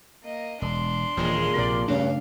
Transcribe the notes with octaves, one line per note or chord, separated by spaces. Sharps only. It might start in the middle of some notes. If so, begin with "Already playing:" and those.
A#3 D#5
E1 D4 C6
D#1 A#2 E3 G#3 G#4
A#1 C3 A#4 D5
G2 C#3 A3 C#4 D4 F5